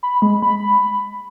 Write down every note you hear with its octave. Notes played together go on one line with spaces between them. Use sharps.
B5
G#3
B5